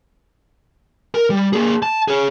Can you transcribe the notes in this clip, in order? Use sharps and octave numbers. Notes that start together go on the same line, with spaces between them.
A#4
G3
A#3 G#4
A5
G#4 C#5